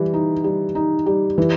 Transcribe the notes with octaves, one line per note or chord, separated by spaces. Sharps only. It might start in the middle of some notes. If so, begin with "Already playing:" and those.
Already playing: E3 G3
D#4
G3
D#4
G3
E3